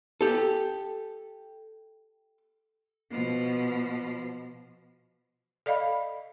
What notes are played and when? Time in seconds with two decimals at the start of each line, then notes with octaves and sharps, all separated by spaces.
0.21 G4 A4
3.11 B2 F3
5.66 A4 D5 D#5 F5 B5